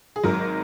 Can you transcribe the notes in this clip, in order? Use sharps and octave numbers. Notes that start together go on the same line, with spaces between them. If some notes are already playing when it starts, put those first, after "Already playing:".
G#4
G#1 G#2 F#3 A#4